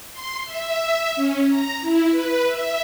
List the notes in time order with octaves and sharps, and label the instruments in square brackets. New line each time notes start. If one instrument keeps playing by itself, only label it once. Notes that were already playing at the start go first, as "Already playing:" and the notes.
[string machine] C6
E5
C#4
A#5
E4
B4
E5